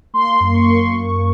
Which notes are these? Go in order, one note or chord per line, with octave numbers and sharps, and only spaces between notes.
A#3 C6
F#2
C#6
F#2
A#3
A#3